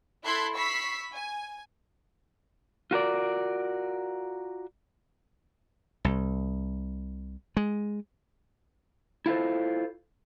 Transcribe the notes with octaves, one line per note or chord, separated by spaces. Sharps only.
E4 A4 C6 F#6 G#6 B6
B5 C#6 E6 B6 C7
G#5
F4 F#4 A#4 D5
C2
G#3
E4 F4 A4 C5